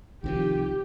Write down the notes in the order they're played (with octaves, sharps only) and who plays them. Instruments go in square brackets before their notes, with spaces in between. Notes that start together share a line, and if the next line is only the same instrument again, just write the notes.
[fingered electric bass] C2 C3 F3 [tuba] D#3 [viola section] G4